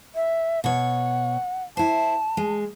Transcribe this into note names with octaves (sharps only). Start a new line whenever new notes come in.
E5
B2 C#5 F#5
E4 C5 A5
G#3